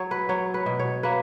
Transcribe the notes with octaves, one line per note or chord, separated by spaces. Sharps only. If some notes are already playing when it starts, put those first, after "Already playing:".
Already playing: F#3 C#5
B4
F#3 C#5
B4
B2
C#5
A#3 B4